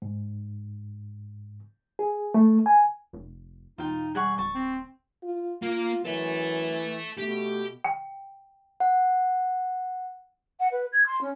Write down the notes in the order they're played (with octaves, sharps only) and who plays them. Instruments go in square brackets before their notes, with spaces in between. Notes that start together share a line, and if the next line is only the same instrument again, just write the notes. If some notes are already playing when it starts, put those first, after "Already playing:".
[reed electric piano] G#2
G#4
A3
G#5
[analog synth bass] F1
[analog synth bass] E1 [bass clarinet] D#4 [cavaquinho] F4 G5
[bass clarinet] G3 [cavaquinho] G#4 F#5 C#6
[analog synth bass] D1 [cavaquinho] A5 C#6
[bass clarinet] C4
[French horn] F4
[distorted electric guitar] A#3 [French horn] F4
[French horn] F#2 [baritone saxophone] E3 [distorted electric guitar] A4 E5
[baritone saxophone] B2 [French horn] A3 [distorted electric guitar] G4
[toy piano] G5
[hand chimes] F#5
[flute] F#5
B4
G#6
C6
C#4